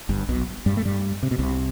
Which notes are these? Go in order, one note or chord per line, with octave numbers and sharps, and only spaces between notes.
G1 G2
B1 B2
G2 G3
A3
G2 G3
C3
B2
C2 C3